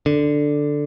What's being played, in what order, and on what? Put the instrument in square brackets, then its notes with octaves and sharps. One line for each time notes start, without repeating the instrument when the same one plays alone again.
[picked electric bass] D3